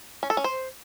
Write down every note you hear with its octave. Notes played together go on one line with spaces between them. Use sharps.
C#4
A4
C#4
C5